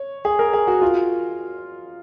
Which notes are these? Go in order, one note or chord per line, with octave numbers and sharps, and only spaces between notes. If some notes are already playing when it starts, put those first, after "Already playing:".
Already playing: C#5
G#4
A#4
G#4
F#4
F4